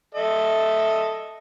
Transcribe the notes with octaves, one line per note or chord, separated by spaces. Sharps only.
A4 D#5 E5